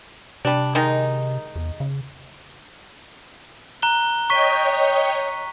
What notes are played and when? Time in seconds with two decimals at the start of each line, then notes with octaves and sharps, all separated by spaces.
0.45 C3 G3 D4
0.75 D#3 G#3 D#4
1.56 E2
1.80 C#3
3.82 A#5 F#6 G7
4.30 C#5 D#5 G5 C#6 B6 D#7